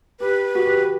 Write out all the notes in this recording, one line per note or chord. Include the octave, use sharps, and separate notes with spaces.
G4 B4
F#4
G4